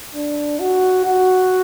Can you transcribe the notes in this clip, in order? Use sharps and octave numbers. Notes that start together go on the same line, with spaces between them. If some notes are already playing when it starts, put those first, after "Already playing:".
D4
F#4
F#4